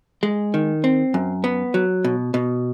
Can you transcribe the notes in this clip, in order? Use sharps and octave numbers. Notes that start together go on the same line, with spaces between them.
G#3
D#3
C4
F#2
B3
F#3
B2
B2